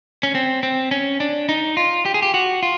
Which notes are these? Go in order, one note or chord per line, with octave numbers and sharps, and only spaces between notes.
C#4
C4
C4
C#4
D4
D#4
F4
G4
G#4
G4
F#4
F4